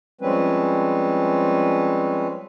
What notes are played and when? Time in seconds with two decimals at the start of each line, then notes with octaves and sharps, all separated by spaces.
0.21 F3 G3 G#3 C4 C#4 B4